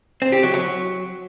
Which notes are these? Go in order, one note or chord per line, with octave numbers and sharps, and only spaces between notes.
C4
G4
F#3
F#3